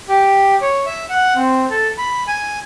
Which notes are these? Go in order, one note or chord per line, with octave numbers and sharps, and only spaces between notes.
G4
C#5
E5
F#5
C4
A4
B5
G#5